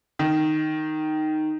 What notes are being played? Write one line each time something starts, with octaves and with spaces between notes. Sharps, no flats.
D#3